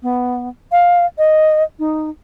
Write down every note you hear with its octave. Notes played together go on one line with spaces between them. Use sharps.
B3
F5
D#5
D#4